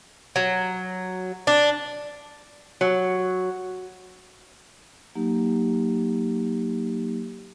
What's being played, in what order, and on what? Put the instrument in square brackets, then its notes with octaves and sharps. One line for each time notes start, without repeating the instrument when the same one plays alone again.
[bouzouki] F#3
D4
[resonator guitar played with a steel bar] F#3
[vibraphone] F#3 A#3 D#4 G4